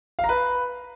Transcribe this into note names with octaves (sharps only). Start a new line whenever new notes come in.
F5
A#5
B4